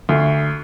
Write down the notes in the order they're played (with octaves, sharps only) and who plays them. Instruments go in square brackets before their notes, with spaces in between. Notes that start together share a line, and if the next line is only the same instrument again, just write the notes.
[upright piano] D2